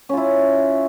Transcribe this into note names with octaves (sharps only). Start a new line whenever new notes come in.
C#4 E4 F4